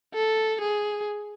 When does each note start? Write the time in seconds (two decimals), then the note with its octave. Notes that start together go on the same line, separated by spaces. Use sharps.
0.14 A4
0.61 G#4